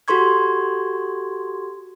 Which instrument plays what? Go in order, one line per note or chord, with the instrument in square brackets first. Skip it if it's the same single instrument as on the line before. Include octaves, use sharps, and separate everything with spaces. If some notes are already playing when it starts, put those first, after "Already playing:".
[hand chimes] F#4 G4 A4 C6 C#6 G#6